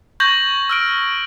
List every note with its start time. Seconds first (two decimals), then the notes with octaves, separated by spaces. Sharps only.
0.20 C#6 G6 G#6 A#6 F#7
0.70 E6 F6 D7